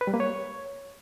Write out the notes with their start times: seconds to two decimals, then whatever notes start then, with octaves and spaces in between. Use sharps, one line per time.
0.01 B4
0.07 G3
0.14 A#3
0.20 C#5